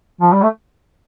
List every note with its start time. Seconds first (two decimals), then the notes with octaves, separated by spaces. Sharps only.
0.21 F3
0.33 G3
0.42 A3